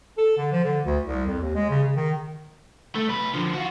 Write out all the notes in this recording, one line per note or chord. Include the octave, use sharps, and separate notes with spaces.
A4
D3
F3
D3
D2
C2
F2
D#2
G#3
C#3
C#3
D#3
A3
B1 B4
D3 F3
F4 F#4